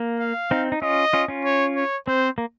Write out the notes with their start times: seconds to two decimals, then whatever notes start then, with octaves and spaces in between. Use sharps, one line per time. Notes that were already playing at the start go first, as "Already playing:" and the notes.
Already playing: A#3
0.20 F5
0.51 C4 D#4
0.72 D#4
0.82 C#4 F4 D#5
1.13 C#4 F4
1.28 C#4 F4
1.44 C#5
1.75 C#5
2.07 C4 C5
2.38 A#3